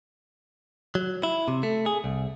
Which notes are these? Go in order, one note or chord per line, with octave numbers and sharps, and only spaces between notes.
F#3
E4
C3
A3
G#4
C2